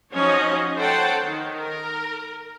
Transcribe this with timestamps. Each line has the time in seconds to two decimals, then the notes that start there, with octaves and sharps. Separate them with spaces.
0.13 F3 C#4 D#4 F#4 C#5 D#5
0.76 A4 C5 C#5 F#5 G5 A5
1.23 D#3
1.58 A#4